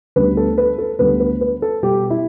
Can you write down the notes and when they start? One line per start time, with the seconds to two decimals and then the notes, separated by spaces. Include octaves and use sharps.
0.16 D2 D3 G3 B3 B4
0.37 A4
0.58 B4
0.78 A4
0.99 D2 D3 G3 B3 B4
1.20 B4
1.41 B4
1.62 A4
1.82 B2 G3 B3 G4
2.10 E4